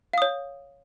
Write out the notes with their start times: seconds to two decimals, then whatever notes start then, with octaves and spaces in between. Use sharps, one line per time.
0.13 F5
0.18 D#6
0.22 C#5